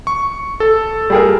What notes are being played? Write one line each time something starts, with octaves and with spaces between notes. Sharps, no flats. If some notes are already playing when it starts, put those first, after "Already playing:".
C#6
A4
G3 G#4 A#4